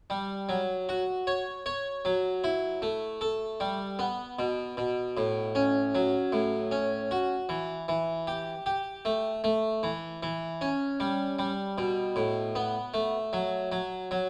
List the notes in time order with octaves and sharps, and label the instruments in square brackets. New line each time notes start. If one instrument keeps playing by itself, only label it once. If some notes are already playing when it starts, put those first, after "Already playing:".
[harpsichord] G3
F#3
F#4
C#5
C#5
F#3
E4
A3
A4
G3
B3
B2
B2
A2
C#4
F#3
A2
C#4
F#4
E3
E3
G4
G4
A3
A3
E3
E3
C#4
G3
G3
B2
A2
B3
A3
F#3
F#3
F#3